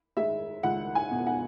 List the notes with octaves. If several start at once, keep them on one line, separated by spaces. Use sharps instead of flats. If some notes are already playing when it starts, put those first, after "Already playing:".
G#3 E5
C#2 F#5
G#5
B2
F#5